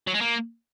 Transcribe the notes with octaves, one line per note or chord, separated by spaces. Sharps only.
F#3
G#3
A#3